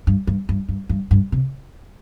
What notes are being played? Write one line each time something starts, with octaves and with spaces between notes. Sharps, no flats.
G2
G2
G2
G2
G2
G2
C3